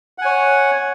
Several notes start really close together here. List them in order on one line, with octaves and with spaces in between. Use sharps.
F#5 G#5 C#5